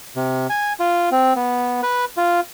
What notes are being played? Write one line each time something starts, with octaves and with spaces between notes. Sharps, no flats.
C3
G#5
F4
C4
B3
B4
F4